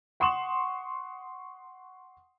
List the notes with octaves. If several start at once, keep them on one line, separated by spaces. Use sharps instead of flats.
F#5 C6 C#6 D#6 E7 F#7